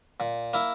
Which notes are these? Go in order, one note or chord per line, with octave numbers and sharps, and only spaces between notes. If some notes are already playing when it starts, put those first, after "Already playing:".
A#2
A#3 E4